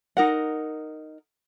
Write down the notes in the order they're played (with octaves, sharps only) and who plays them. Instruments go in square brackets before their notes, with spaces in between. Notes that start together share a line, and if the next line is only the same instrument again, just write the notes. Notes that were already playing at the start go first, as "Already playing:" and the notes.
[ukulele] D#4 A#4 F#5